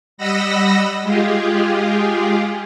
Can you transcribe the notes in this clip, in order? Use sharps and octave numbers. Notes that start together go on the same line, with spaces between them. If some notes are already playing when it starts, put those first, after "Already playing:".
G3 D#5 F#5 B5 E6 A#6
G#3 F4 G4 G#4